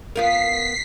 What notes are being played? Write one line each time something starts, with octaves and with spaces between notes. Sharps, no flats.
B3 F4 A#4 B6 C7